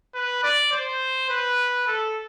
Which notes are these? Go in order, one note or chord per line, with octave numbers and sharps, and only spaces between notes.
B4
D5
C5
B4
A4